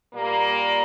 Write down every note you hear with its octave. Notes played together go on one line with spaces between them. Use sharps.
A#2 G3 A#3